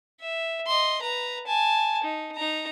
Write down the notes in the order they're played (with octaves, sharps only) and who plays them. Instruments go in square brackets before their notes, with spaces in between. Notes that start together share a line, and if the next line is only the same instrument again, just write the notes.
[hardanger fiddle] E5
D#5 C6
B4 A#5
G#5 A5
D#4
D#4 A#5